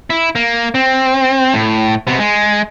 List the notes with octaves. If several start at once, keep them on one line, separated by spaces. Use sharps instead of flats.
E4
A#3
C4
A2
C3 B3
G#3